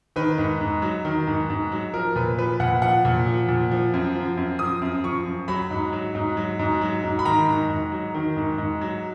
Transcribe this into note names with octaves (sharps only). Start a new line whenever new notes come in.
D#3 B4
G#2
G#2
F#3
D#3
G#2
G#2
F#3
F3 A#4
A#2 B4
F3 B4
A#2 F#5
F3 F#5
A#2
F3
A#2
F3
F#2
F3
F#2
F3 D#6
F#2
F3 C#6
F#2
F#3 B5
G#2
F#3
G#2
F#3
G#2
F#3
G#2
B5
D#3 A#5
G#2
G#2
F#3
D#3
G#2
G#2
F#3